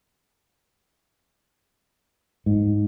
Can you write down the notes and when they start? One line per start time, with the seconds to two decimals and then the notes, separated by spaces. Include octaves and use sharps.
2.46 G#2